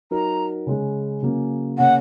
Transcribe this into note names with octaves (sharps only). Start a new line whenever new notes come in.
F#3 D#4 A#4 A#5
C#3 G#3 C#4
C#3 F#3 A#3 C#4
C#3 A#3 C#4 F#5